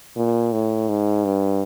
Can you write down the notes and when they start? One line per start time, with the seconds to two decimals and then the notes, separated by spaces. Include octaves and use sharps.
0.17 A#2
0.53 A2
0.89 G#2
1.25 G2